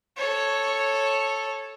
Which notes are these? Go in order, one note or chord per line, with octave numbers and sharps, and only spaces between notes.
A4 C#5